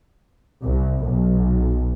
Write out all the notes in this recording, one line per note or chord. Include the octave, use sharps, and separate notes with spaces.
C2
B1